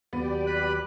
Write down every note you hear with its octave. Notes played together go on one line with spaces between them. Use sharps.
D#2 F#3 B3 G4 D5
B4 B5 F#6